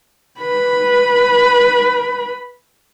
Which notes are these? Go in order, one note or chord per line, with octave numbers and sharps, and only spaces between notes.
B4 B5